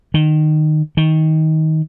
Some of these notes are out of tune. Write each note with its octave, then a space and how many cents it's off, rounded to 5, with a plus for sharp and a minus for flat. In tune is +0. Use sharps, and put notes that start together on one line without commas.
D#3 -20
D#3 +15